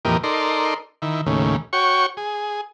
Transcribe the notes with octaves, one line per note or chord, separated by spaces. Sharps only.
F2 A#2 E3 G4 A#4 D#5
D#4 A4 A#4 D5 C6
D#3 E4
D#2 A2 C#3
F#4 C#5 G5 C#6
G#4